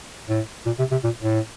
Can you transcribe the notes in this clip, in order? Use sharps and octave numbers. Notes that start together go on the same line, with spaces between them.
A2
A#2
C3
C3
A#2
A2